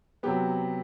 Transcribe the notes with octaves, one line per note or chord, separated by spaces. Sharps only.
C3 F#3 B3 G4